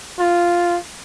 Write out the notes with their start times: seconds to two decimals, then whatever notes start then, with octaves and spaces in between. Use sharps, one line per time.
0.20 F4